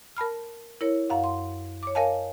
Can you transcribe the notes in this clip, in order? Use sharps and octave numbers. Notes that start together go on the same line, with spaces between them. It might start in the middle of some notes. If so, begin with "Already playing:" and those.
A#4 A5 B5 F6
E4 A#4 C#5
F#2 F5 F#5
C6
C#5 D6
A#4 C#5 D#5 F5 G#5 A5